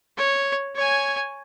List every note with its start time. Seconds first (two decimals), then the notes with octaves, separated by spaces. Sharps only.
0.17 C#5
0.76 C#5 G#5